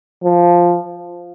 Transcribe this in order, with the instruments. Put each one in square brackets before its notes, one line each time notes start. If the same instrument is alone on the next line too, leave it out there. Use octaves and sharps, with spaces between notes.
[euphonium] F3